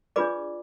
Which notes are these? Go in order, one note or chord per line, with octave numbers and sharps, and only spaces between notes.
D4 F4 G#4 B4 D5 D6